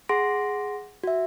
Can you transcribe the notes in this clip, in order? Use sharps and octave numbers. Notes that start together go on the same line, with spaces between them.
G#4 F#5 C6 A#6 D7
F#4 E5